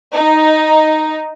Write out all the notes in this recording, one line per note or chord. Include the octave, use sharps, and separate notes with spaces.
D#4